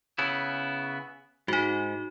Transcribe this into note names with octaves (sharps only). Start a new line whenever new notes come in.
C#3 B3 E4
G#2 D#4 F#4